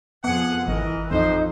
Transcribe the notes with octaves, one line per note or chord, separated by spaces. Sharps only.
F2 F3 B3 G#4 F#5
G#1 E3 A#4 D#5
A1 F2 D#4 C5